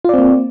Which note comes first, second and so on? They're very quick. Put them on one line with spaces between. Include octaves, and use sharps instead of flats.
F4 D5 C4 A#3